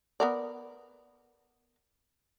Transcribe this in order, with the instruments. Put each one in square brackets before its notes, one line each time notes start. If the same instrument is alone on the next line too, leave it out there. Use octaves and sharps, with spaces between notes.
[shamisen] B3 A#4 D5